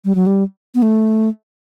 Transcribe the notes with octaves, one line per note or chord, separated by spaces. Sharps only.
G3
F#3
G3
B3
A3